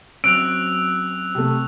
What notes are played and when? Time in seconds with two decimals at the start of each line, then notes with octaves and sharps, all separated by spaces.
0.24 F#3 C4 C#4 E6 F#6 D7 F7
1.35 C3 A3